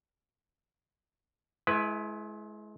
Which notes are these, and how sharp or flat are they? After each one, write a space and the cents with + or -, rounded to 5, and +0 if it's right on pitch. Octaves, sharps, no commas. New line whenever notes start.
G#3 +35 E4 +0 B4 +0